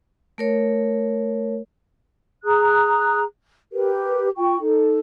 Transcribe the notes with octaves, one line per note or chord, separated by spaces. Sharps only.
A3 A#4 C#5
G#4 A#5 D#6 F#6
G4 A#4 B4
F4 G5 C#6
D#4 A4